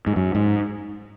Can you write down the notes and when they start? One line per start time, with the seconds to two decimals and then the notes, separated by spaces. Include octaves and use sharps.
0.07 G#2
0.16 F#2
0.35 G#2